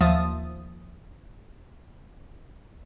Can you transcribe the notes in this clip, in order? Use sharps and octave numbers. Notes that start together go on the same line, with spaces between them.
D#2 F3 E5 D#6 A6